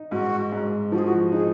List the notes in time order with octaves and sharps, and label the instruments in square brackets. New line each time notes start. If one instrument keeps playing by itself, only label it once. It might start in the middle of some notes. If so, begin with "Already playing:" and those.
Already playing: [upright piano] D#4
[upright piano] G#2 [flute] F#4
[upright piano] G#2
[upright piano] F3 [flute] F#4
[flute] G#4
F#4
[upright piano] D#4 [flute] G#4